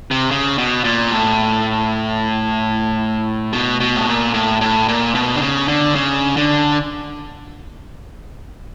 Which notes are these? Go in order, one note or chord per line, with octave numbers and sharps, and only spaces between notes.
C3
C#3
B2
A#2
A2
B2
B2
A2
A#2
A2
A2
A#2
B2
D3
C#3
D3
C#3
D3